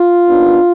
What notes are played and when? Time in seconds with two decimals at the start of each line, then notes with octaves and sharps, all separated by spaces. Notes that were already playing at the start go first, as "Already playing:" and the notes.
Already playing: F4
0.27 D#2 D#3 B3 D4